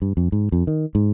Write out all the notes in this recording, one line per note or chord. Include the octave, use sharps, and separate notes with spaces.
G2
F2
G#2
F2
D#3
G#2